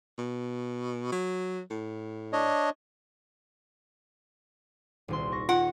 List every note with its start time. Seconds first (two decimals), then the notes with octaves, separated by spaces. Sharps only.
0.18 B2
1.12 F#3
1.70 A2
2.33 D4 C#5 D#5
5.08 D#1 C2 C6
5.32 C#6 A#6
5.49 F4 F#5